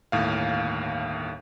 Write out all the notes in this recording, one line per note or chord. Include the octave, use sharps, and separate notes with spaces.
G1 D#2 A2 F5